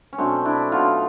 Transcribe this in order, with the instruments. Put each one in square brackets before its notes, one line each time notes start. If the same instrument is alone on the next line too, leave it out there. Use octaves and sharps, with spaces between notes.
[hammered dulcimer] C#4
B2 F#3 A3 C4 D4
D4 E4
B2 F#3 A3 D#4 F4